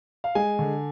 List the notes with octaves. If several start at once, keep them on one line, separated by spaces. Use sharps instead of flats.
F5
G#3 G#5
D3